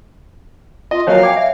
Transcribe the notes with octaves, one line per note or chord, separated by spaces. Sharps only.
F4 D#5
F3 F#3 A#3 C#5 D#5 F5 G#5
C#5 D5 G5 G#5 D6
E5